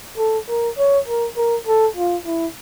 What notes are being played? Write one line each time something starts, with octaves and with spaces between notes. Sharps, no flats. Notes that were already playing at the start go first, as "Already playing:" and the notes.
A4
A#4
C#5
A#4
A#4
A4
F4
E4